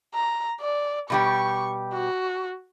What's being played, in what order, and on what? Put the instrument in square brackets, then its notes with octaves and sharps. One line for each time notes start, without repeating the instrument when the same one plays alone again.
[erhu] A#5
D5
[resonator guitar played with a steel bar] B2 G3 G4 [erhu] C#6
[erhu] F#4